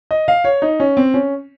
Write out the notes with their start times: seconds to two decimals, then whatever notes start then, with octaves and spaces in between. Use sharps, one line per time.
0.11 D#5
0.28 F5
0.44 C#5
0.62 D#4
0.80 C#4
0.97 C4
1.14 C#4